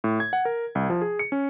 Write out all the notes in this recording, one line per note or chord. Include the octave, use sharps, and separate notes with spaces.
A2
G#6
F#5
A#4
C2
F3
G#4
C#7
C#4